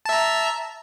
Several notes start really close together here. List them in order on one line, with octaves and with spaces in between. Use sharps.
A5 E5 A#5